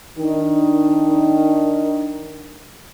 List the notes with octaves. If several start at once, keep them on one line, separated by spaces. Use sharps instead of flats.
D#3 D4 D#4